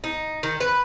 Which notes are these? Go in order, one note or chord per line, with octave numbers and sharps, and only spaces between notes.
D#4
D#3
B4